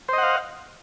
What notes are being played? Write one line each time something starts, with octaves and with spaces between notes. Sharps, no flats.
C5 D#5 F5 F#5